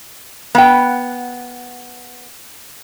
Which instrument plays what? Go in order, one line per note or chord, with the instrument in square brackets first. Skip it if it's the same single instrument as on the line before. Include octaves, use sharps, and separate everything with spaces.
[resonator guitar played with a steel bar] B3 G5